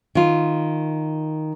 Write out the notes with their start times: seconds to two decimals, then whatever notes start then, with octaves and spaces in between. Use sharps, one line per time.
0.15 D#3 F4